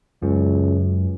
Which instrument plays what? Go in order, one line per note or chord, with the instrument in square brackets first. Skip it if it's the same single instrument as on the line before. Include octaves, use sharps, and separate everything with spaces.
[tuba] C#2 [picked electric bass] F#2